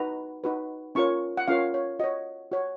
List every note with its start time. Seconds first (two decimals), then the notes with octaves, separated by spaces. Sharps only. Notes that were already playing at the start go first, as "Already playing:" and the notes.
Already playing: D#4 F#4 B4 A#5
0.44 D#4 F#4 B4
0.95 C#4 F4 A#4 C#5 C#6
1.37 F#5
1.48 C#4 F4 A#4 C#5 F5
1.74 C#5
1.99 F#4 C#5 D#5
2.52 F#4 C#5